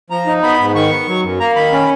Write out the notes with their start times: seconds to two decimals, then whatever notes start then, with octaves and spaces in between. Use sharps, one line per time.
0.10 F3 A#5
0.26 D#4
0.43 B3 B5
0.59 G#2
0.75 D#3 C#6
0.91 B3
1.08 F#3
1.23 F#2
1.40 A#3 A#5
1.56 D#3 B5
1.72 C#4